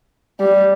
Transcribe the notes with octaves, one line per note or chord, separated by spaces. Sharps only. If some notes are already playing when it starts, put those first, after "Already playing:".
G3